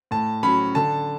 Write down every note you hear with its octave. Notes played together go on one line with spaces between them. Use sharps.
A2 A5
F#3 C#4 B5
D3 A5